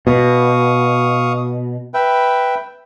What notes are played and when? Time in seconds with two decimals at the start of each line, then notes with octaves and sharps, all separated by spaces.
0.07 B2 F5 C#6 D#6
1.94 B4 E5 G5